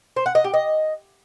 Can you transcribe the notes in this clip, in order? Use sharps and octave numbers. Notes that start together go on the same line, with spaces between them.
C5
F#5
D#5
G4
D#5